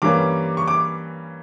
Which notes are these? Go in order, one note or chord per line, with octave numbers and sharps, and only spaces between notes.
G2 E3 G3 A#3 C#4 D6
C#6
D6